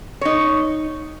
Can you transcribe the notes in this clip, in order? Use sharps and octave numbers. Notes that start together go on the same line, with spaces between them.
D#4 C#5